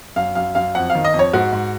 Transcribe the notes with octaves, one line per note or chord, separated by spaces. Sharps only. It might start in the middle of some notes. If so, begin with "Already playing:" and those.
F#2 F5
F#2 F5
F#2 F5
F2 F#5
F5
D#3
D#5
F2
C#5
G#2 F#4
G#2